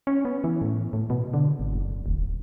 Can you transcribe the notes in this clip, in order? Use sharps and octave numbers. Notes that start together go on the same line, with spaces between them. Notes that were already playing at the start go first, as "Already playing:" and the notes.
C#4
B3
E3
A2
A2
B2
D3
G#1
F#1
D1